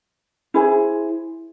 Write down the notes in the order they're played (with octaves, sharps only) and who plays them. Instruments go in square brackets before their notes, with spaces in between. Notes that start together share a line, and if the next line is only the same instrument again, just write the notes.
[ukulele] E4 G#4 C5